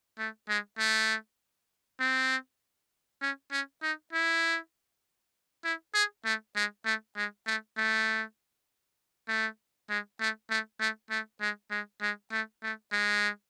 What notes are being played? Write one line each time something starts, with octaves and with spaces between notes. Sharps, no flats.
A3
G#3
A3
C4
C#4
C#4
D#4
E4
E4
G#4
A3
G#3
A3
G#3
A3
A3
A3
G#3
A3
A3
A3
A3
G#3
G#3
G#3
A3
A3
G#3